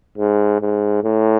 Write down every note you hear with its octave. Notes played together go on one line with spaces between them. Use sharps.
G#2
G#2
A2